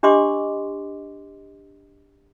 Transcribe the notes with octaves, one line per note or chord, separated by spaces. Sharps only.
D4 G4 D#5 C6 D6